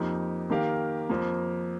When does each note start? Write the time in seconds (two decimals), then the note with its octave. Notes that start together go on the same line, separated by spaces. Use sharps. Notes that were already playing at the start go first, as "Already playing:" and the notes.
Already playing: F2 F3 A#3 D#4 G4
0.50 D#3 A#3 G4 A#4 F5
1.09 F2 F3 A#3